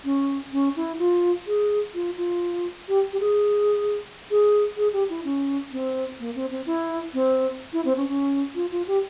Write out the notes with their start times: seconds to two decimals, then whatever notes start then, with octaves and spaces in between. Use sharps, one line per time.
0.04 C#4
0.52 C#4
0.76 E4
0.99 F4
1.47 G#4
1.94 F4
2.17 F4
2.88 G4
3.13 G4
3.20 G#4
4.31 G#4
4.77 G#4
4.93 G4
5.09 E4
5.24 C#4
5.72 C4
6.20 A#3
6.35 C4
6.50 C4
6.66 E4
7.14 C4
7.73 E4
7.85 C4
7.97 C#4
8.08 C#4
8.55 F4
8.71 F4
8.87 G4